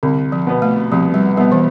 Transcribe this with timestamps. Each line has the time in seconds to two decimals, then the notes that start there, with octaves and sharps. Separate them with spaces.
0.03 C2 D3
0.32 F3
0.47 B2 B3
0.62 A3
0.92 C2 F3
1.14 G3
1.37 B2 G3 B3
1.52 E3